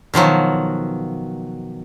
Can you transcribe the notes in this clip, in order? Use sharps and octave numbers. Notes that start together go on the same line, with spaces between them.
B2 D#3 F3 F#3